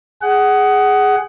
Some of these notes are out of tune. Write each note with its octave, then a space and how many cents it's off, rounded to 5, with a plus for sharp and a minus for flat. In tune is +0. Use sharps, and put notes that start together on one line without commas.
G#4 +0 F#5 +20